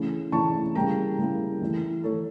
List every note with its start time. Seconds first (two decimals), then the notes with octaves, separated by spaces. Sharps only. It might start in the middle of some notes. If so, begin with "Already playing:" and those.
Already playing: C#3 E3 A3 C#4 E4
0.32 C#3 E3 A3 C#4 E4 A5 C#6
0.75 C#3 G3 A#3 E4 G5 A#5
1.18 C#3 G3 A#3 E4
1.61 E3 A3 E4
2.04 E3 A3 E4 A4 C#5